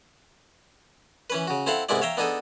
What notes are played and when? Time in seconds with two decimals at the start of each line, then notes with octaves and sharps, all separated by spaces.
1.30 E3 C#4 B4
1.47 C#3 F#4
1.67 C4 E4 A4 F5 F#5
1.89 C2 G#2 G#3 B3 E4 D5
2.01 C#5 E5 F5 G5 A#5
2.17 B3 D4 D#4 G#4 A4